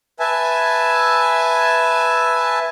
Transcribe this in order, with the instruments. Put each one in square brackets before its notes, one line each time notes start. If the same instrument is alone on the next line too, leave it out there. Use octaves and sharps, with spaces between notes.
[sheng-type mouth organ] B4 E5 G#5 A5